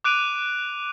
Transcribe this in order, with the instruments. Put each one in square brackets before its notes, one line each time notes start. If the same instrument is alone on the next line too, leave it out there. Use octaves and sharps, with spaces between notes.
[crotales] D6 F#6 D7 D#7 F7